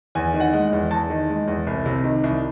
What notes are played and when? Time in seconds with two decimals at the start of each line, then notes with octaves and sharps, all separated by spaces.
0.15 E2 G#5
0.34 D#3
0.40 F#5
0.53 G#3
0.73 E2
0.91 E2 A5
1.10 D#3
1.29 G#3
1.48 E2
1.67 C2
1.86 C3
2.04 D#3
2.23 C2